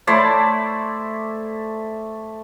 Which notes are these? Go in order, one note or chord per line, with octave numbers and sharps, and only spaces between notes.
A3 E4 C5 D5